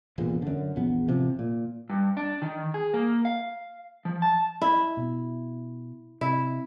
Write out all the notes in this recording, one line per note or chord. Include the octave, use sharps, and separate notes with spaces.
E1 A1 E2 A#2
F#2 D3
A#1 E2 B3
A1 C3 F3
A#2
G2
D4
D#3
G#4
A#3
F5
F3
A5
E4
B2
C3 E4